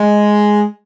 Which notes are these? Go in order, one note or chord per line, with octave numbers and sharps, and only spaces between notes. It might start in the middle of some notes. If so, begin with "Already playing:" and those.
Already playing: G#3